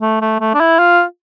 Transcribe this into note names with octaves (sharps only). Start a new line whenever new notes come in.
A3
A3
A3
D4
E4
F4